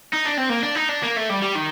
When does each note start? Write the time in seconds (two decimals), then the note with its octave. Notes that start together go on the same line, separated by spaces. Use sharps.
0.13 D#4
0.25 D4
0.38 C4
0.50 A#3
0.63 D4
0.76 D#4
0.89 D4
1.03 A#3
1.16 A3
1.29 G3
1.42 G3
1.55 D#3